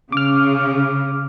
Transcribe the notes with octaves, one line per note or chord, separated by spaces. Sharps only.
C#3 D6 F6